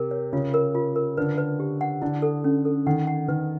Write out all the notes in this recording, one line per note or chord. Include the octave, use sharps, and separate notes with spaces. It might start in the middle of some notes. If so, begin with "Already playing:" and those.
Already playing: C3 A#4
C#5
C#3 F4
A#4
F4
A#4
D3 B4
B4
G4
F#5
D3 E4
A4
C#4
A4
D#3 F#5
F#5
D#3 B4